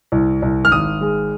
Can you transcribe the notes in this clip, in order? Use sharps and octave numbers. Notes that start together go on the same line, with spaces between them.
C2
C2
F6
G#1 D#6
G#3